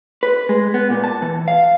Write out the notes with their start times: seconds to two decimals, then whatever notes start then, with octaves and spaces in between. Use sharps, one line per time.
0.23 B4
0.49 G#3
0.74 B3
0.90 A#2
1.04 A5
1.22 E3
1.48 F5